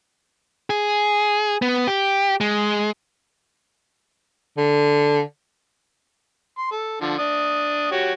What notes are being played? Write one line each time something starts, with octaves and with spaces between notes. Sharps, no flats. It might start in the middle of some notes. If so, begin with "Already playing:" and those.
G#4
B3
G4
G#3
D3
C6
A4
D3 F3
D4 D#6
F#4 G4 C#5